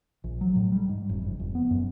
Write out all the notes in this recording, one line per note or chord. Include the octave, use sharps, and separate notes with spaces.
A#1
F#3
A2
G3
G#2
F1
F#1
F1
B3
F#2